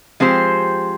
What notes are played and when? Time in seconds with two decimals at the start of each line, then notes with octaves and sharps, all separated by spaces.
0.20 F3 G#3 C4 G4 C5